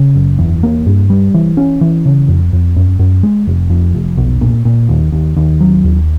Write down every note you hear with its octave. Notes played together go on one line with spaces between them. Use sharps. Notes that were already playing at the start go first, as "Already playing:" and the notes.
Already playing: C#3
F#1
E2
A#3
G2
G3
E3
C#4
E3
C#3
F2
F2
F#2
F#2
G#3
F1
F2
F1
B1
A#2
A#2
D#2
D#2
D#2
F#3
D#2